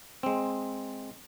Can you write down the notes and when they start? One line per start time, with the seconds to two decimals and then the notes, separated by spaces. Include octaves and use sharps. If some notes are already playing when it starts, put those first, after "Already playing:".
0.23 G#3 C4